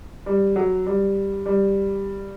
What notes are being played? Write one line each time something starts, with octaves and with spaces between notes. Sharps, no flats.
G3
F#3
G3
G3